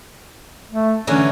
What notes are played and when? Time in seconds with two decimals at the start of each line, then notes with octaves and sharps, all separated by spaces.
0.71 A3
1.07 D3 E3 F#3 C#4